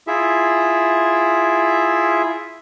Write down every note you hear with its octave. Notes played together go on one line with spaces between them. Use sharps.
E4 F4 G#4 E5